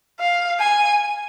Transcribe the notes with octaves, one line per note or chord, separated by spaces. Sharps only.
F5
G#5